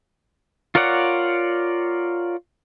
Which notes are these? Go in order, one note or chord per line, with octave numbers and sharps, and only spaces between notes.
F4 A#4 C#5 D5 F#5